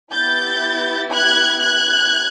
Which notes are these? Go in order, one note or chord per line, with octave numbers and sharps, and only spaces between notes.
B3 E4 G4 G6 A6
F#6 G#6
F#6 G#6